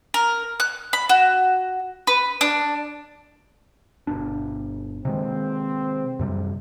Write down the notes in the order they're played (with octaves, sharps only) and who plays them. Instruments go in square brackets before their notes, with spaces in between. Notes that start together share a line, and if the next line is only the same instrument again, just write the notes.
[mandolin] A#4
F#6
B5
F#4
B4
D4
[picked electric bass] G1 B2 D4
[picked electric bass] C3 D#3 G#3 [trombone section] C4
[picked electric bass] F#2 C3 G3